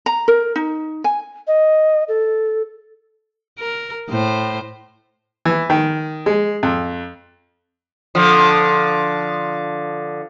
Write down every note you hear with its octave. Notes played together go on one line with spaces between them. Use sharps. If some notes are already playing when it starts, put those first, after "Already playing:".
A#5
A#4
D#4
G#5
D#5
A4
A#4
A2 C5
E3
D#3
G#3
F2
D3 F3